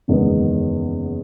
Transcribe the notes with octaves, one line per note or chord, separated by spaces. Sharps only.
F#1 E2 D#3 G#3 B3